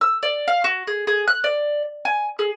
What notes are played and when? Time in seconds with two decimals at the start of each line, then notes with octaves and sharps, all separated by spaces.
0.01 E6
0.23 D5
0.48 F5
0.64 F#4
0.87 G#4
1.07 G#4
1.27 F#6
1.44 D5
2.05 G#5
2.39 G#4